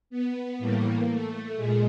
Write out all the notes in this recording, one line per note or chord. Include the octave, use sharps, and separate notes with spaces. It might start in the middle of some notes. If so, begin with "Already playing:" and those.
B3
A2 E3 G3 A#3
A3
A#2 G#3